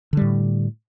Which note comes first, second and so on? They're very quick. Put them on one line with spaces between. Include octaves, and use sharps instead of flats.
D3 G3 A2